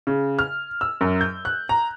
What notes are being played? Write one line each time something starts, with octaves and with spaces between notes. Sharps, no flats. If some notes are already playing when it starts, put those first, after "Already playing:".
C#3
F6
E6
F#2
G6
F#6
A#5